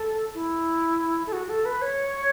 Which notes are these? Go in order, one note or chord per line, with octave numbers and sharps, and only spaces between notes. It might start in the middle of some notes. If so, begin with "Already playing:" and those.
Already playing: A4
E4
A4
F#4
A4
B4
C#5